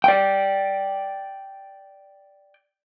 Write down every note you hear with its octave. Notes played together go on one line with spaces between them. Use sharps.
D5 G5